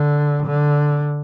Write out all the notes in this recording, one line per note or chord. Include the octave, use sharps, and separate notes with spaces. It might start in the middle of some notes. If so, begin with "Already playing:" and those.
Already playing: D3
D3